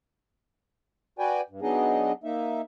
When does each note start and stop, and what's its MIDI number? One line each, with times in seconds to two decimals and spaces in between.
1.19 1.41 66
1.19 1.41 71
1.19 1.41 74
1.19 1.41 79
1.19 1.41 80
1.50 1.60 43
1.62 2.12 54
1.62 2.12 59
1.62 2.12 62
1.62 2.12 63
1.62 2.12 68
1.62 2.12 75
2.24 2.61 58
2.24 2.61 63
2.24 2.61 76